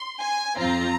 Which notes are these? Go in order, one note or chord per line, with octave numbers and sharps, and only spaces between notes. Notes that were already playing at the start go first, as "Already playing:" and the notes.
Already playing: C6
G#5
F2 F3 C4 F4 A#5